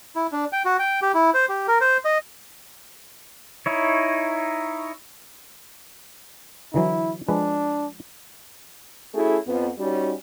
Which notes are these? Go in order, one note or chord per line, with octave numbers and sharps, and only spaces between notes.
E4
D4
G5
F#4
G5
G4
E4
C5
G4
A#4
C5
D#5
D#4 E4 C#5
D3 E3 F#3 E4
F3 G#3 D4 B4
A3 C#4 E4 F#4 G#4 A4
F2 B3
G3 C#4 D#4 F#4